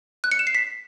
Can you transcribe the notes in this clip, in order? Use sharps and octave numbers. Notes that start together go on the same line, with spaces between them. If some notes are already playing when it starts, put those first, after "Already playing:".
F#6
C#7
E7
C7
B6